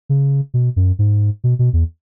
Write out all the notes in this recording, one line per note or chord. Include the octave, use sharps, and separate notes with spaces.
C#3
B2
F#2
G#2
B2
B2
E2